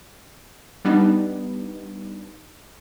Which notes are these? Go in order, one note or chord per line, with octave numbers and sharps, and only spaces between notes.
G3 B3 D4 D#4